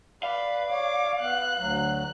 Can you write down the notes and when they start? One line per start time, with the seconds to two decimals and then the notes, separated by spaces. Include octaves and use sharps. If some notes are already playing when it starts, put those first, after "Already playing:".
0.23 B4 D5 F5
0.70 C#5 D5 D6
1.21 B3 F#6
1.59 D2 F#3